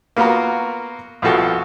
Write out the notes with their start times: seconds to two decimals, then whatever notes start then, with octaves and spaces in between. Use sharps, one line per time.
0.16 A#3 B3 F4 F#4 A#4
1.22 C2 B2 F3 F#4 A4 G5